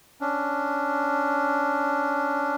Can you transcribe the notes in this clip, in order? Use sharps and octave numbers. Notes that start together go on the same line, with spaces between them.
C#4 D4